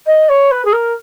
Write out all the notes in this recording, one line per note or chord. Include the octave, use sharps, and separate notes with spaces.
D#5
C#5
B4
G#4
A#4